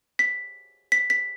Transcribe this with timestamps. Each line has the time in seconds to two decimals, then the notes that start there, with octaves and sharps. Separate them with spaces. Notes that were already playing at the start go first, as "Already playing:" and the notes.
0.19 B6
0.92 B6
1.10 B6